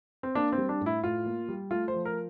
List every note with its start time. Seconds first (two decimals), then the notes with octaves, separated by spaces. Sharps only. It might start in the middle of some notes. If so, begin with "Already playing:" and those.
0.23 C4
0.35 A#3 D4
0.52 C4
0.58 G3
0.69 D4
0.81 A2
0.86 E4
1.03 A2 F4
1.26 A#3
1.49 G3
1.71 A3 F4
1.88 C5
1.94 F3
2.05 A#4